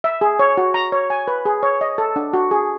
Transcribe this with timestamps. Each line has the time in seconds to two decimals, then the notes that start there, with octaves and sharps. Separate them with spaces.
0.04 E5
0.21 G#4
0.39 C#5
0.57 F#4
0.74 A#5
0.92 C#5
1.10 G#5
1.28 B4
1.45 G#4
1.63 C#5
1.81 D#5
1.98 A4
2.16 D4
2.33 F#4
2.51 G#4